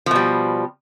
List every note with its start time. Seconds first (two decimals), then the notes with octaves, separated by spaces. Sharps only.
0.06 F3
0.11 B2
0.15 G3